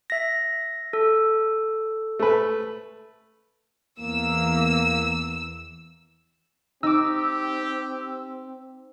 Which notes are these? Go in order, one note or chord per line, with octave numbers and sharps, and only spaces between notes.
E5 A#6
A4
A3 B4
E2 A#3 E6
C4 D#4 G4 D6 E6